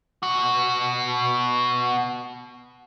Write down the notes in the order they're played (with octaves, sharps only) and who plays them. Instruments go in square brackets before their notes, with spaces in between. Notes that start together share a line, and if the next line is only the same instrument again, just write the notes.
[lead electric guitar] B2 F#4